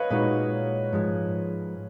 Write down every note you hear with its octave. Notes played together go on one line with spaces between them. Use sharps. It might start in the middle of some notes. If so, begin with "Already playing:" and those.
Already playing: B4 C#5 D#5 F5
A#2 G#3 D#4 F#4 B4
G#2 F3 G#3